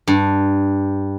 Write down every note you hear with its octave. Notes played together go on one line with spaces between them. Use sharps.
G2